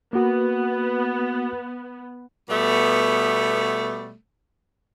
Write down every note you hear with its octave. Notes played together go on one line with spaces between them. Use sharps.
A#3 B3 F#4
B2 G3 A3 B3